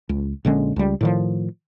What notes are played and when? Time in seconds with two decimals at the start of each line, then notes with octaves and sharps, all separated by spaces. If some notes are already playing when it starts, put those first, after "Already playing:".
0.09 C#2
0.45 A#1 D3 G#3 C#4
0.76 C#2 G3
1.01 A2 D#3 F3